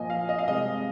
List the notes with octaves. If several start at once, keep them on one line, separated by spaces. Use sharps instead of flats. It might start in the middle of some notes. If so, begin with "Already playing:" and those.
Already playing: A#2 F3 A#3 D#5 G#5
F5
D#5
F5
C2 C3 G#3 D#5